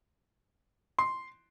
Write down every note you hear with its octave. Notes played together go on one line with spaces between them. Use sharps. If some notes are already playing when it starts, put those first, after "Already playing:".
C6